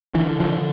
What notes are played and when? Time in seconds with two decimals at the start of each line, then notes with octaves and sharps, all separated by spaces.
0.14 D3 E3
0.40 D3 F3